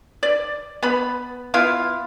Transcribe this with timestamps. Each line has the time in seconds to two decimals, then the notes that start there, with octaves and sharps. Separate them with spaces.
0.23 D5
0.83 B3 B5
1.54 B3 E4 F4 F5